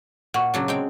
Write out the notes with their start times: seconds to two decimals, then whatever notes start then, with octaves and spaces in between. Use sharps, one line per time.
0.34 A#2 F#5 C#6
0.54 C#3 F#3 D4
0.68 G#3 C4 G5